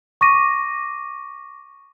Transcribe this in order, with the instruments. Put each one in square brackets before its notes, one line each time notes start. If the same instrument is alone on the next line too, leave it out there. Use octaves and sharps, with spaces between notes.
[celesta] C#6 D6 A#6 D#7